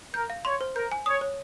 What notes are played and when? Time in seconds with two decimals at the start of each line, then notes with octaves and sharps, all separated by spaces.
0.14 A#4 G6
0.30 F5
0.45 C#5 C6
0.61 C5
0.76 A#4 G6
0.92 G#5
1.06 C#5 D#6
1.21 C#5